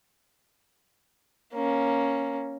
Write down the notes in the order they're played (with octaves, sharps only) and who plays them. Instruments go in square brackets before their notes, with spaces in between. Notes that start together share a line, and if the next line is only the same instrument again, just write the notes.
[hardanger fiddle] A#3 C#4